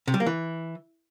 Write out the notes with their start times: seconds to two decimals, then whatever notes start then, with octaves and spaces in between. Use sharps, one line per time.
0.08 C3
0.14 G3
0.20 A#3
0.26 E3